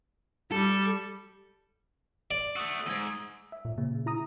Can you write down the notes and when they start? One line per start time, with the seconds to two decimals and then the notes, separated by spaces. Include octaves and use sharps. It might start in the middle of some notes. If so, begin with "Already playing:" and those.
0.52 G3 A4
2.31 D5
2.56 A3 F#4 D#6 E6
2.86 E2 G#2 E6 G#6
3.52 E5
3.65 A#2
3.78 A#2 C#3
4.06 E4 A#5 D#6